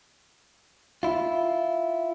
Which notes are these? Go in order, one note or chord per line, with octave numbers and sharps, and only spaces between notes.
E4 F4